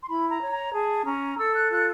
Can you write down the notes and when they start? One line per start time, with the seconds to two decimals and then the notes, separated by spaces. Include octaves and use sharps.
0.03 C6
0.08 E4 B5
0.30 A#5
0.41 C#5
0.52 A#5
0.73 G#4 A5
1.06 C#4 A#5
1.38 A4 E6
1.54 F#6
1.71 F4 F#6